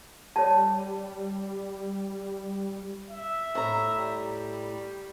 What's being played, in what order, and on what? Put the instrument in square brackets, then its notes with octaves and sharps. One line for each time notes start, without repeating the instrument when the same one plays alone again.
[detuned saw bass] G3 [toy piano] C#5 A5
[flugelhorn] E5
[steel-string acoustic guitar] A2 A#5
[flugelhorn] G3